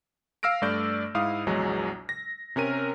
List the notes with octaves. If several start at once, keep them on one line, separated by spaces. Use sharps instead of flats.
F5 E6 F6 A#6 D7
G2 A3 D5 G6
G#2 E4 F5 D#6
A#1 E2 F#3 G#3
A#6
C3 C#4 A#4 D#7